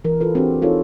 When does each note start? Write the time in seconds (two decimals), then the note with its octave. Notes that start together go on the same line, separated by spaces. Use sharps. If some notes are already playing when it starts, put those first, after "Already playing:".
0.05 E3 A#4
0.20 F4 A4 B4
0.35 C4 D4 F#4 G4
0.62 D#4 F4 G#4 A4 C#5